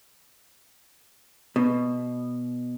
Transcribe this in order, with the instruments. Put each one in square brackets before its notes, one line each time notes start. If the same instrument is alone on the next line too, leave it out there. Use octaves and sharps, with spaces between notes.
[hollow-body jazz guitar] B2